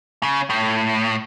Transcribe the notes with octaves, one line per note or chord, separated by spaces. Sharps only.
C#3
A2